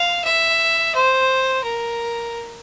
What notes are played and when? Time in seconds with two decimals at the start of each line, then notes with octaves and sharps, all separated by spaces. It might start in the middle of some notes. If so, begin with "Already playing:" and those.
Already playing: F5
0.24 E5
0.95 C5
1.64 A#4